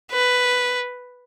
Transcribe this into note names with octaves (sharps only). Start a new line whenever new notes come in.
B4